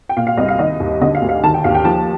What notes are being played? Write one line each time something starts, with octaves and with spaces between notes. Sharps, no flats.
G5
A#2 F5
F5
C2 D#5
F5
D#3 D#5
D#2
D3 D#5
F5
D2
F5
D#3 A5
G5
D#2 F5
G5
F3 A5